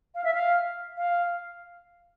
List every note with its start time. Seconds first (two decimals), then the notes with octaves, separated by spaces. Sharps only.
0.15 F5
0.24 E5
0.34 F5
0.98 F5